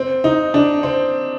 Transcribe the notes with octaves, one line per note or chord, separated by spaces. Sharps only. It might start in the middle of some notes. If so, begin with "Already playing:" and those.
Already playing: C4
D#4
D4
C4